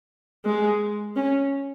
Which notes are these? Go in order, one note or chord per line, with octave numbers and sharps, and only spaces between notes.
G#3
C#4